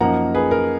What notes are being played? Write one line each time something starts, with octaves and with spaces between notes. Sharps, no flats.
F#2 F3 A#3 D#4 F#5 A#5
G#4 B4
A#4